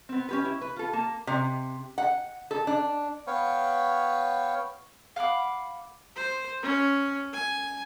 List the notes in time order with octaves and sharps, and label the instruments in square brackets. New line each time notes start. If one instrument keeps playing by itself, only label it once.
[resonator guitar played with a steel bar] B3 C4
C#4 G4 B4
E4
B4
F4 A4
A#3 A5
C3
F#5
A4
D4
[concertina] B3 B4 C#5 F5 G5 C#6
[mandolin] F5 F#5 B5 D6
[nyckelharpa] C5
C#4
G#5